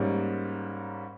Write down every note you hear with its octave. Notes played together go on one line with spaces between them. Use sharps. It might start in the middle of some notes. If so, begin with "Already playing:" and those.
Already playing: G#2 G3 A#3 C#4